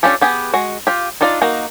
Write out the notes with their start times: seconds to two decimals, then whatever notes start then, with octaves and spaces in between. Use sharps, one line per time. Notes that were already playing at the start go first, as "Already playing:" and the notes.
0.03 C#4 D4 F4 G4 A4
0.21 B3 G4 G#4
0.54 G#3 F#4
0.87 F4 G4
1.21 D4 D#4 F4 D5
1.42 A#3 D#4 F#4